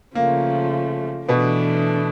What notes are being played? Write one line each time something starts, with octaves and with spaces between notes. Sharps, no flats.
C#3 F3 A3 A#3
B2 E3 A3 B3 D4